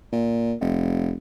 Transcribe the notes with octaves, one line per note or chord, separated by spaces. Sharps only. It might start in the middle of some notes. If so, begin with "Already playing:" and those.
A#2
F1